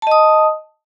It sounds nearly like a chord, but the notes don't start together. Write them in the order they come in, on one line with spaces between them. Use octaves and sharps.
A5 D#5 D#6